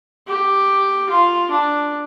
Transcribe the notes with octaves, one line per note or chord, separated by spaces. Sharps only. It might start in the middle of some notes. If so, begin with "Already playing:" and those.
G4
F4
D4